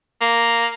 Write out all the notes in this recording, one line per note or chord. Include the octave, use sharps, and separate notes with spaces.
A#3